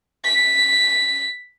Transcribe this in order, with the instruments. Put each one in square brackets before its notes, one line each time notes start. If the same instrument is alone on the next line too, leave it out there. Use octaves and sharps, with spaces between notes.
[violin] B6